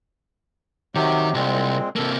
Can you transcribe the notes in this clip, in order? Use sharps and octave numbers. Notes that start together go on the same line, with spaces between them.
C3 D#3 F#3 G4
C2 A#2 G#3 C4
C3 A#3 A4